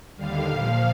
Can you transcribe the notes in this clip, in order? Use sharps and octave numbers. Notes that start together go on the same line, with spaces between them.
D#2 D3 G3 F5
A#2 F3